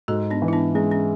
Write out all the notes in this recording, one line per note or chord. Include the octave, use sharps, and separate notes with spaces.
G#2 F#4 A4
B3 D4
E3
E4
B3 D4
G#3 C#4
C#4